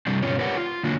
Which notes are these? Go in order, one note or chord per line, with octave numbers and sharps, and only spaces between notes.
C3 G3 C4 D4
G2 B2 C#4 F4 C#5
G4 A#4 B4 C#5 D5 F#5
F4
D3 F#3 A#3 D4